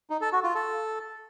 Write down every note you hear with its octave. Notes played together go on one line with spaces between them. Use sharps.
D#4
A4
F#4
F4
A4